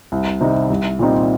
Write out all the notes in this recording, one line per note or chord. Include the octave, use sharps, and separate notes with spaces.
C2
C3 G3 C4 D#4
C2
A#2 G3 C4 D#4